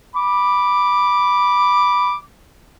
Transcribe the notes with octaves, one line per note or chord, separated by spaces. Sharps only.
B5 D6